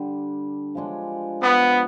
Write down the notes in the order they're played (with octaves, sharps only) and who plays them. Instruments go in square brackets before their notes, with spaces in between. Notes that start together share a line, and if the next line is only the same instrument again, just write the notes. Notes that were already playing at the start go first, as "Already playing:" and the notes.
Already playing: [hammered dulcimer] D3 G3 D4
F3 G#3 D4
[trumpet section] B3